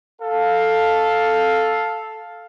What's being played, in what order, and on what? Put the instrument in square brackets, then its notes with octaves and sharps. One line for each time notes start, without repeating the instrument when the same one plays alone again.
[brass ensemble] A4 F5